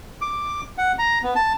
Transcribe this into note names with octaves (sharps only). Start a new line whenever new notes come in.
D6
F#5
A#5
B3
A5